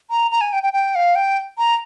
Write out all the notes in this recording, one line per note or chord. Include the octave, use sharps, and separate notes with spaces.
A#5
A#5
G#5
G5
G5
G5
F5
G5
A#5